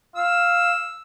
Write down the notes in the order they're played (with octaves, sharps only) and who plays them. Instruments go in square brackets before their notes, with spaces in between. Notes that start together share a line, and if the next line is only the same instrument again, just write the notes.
[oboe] F5 [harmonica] E6